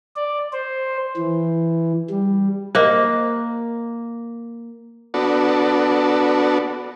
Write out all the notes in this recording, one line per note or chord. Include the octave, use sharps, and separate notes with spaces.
D5
C5
E3
G3
A#3 A#4 C5 D#5
B3 D4 F#4 A4